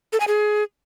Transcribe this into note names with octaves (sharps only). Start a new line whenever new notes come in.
A4
G#5
G#4